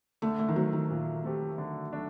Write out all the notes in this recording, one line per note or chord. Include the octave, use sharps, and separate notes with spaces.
D3 A3
A3
D#3
F#3 A3 C4
D#3
A#2
A3 C4 G4
D3
F#3 A3 D4 F#4